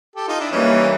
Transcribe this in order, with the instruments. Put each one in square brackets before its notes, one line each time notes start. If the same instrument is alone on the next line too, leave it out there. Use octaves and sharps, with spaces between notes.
[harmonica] G4 A4
D#4 F4
D4 E4
[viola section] E3 G3 A#3 [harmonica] C#4 D#4